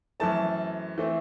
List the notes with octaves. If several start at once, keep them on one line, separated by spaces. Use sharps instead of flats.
F#2 E3 A3 C4 A5
E3 A3 C4